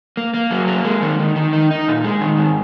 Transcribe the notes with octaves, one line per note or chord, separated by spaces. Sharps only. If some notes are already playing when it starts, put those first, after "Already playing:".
A#3
A#3
F#3
A#3
G#3
D#3
D#3
D#3
D#4
D#4
A#2
G#3
D#3
G#2